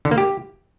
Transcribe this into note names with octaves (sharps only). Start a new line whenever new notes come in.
D3
A#3
G4